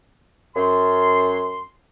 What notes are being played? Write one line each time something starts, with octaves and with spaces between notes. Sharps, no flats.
F#2 C6